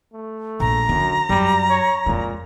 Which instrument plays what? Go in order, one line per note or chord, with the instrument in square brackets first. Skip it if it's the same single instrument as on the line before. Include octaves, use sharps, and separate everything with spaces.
[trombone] A3
[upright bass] A#1 [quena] A#5
[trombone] F#2 [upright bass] D3
[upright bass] F#2 [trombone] G3
[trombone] C#5
[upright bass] F2 G#3 [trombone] A#2